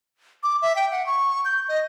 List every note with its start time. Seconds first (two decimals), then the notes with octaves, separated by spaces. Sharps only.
0.43 D6
0.62 E5
0.76 G5
0.92 F#5
1.06 C#6
1.45 G6
1.69 D#5